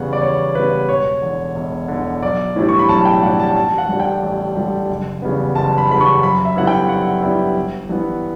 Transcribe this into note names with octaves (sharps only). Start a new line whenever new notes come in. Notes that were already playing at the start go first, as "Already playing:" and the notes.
Already playing: E2 C#3 G3 B3 F#5
D5
E2 C#5
C#3 G3 B3 B4
E1 C#5
E2 D3
E1
E2 D3
B1 D5
A2 E3 G3 D4
C#6
B5
B1 A5
G5
A2 E3 G3 D4 F#5
A5
A1 A5
F#5
G2 D3 G3 D4
G5
A1
G2 D3 G3 D4
F#1
E2 C#3 G3 B3
F#1 A5
B5
E2 C#3 G3 B3 B5
C#6
F#2 B5
E5
D3 G3 B3 E4 F#5
G5
F#2 F#5
D3 G3 B3 E4
G1
G2 E3 B3